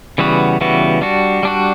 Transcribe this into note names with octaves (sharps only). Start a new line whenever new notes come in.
C#3 E3 G3 B3 F#4
C#3 E3 G3 B3 F#4
G3 D4 F#4
G3 D4 F#4